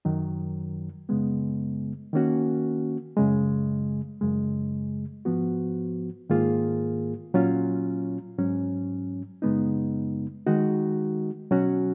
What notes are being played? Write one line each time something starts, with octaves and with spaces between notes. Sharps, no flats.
F#2 D#3 F#3
F#2 C#3 G#3 B3
D#3 A#3 C#4 F#4
F#2 C#3 G#3
F#2 C#3 G#3
G#2 F3 B3 F#4
G#2 D#3 A#3 F4 G#4
A#2 F#3 C#4 F4
G#2 F#3 C#4
F#2 C#3 G#3 B3 D#4
D#3 G#3 D#4 F#4
B2 F#3 C#4 F#4